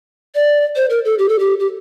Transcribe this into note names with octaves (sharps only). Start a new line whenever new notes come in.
D5
C5
A#4
A4
G4
A4
G4
G4